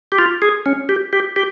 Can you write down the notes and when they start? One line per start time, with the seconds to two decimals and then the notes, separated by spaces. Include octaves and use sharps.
0.12 G4
0.18 F4
0.42 G#4
0.66 C#4
0.89 G4
1.13 G4
1.36 G4